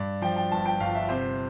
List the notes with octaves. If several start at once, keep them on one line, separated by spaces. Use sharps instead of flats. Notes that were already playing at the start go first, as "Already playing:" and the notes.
Already playing: G2 D5
F3 G5
G5
G1 A5
G5
G1 F5
E5
C3 C5